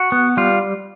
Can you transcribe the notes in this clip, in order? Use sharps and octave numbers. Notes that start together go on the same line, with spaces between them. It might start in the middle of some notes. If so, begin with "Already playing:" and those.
Already playing: F#4
B3
G3 F4